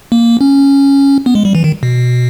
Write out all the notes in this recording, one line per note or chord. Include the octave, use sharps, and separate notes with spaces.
A#3
C#4
B3
G#3
G3
E3
D#3
B2